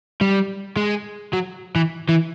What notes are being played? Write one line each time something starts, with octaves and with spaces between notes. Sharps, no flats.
G3
G#3
F#3
E3
E3